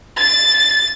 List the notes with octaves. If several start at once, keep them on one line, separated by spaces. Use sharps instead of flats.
A6